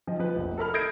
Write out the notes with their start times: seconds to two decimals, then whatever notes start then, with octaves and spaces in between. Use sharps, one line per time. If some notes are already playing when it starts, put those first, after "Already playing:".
0.07 F3 D#5
0.19 F3 B4
0.35 F1 A#1
0.58 A4 A#4 B5 F6
0.74 D#6 G6 G#6 A#6 C7 D7